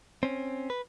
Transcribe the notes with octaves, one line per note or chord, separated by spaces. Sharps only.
C4 C#4
B4